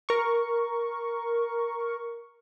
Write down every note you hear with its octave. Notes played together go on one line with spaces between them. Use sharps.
A#4 C#6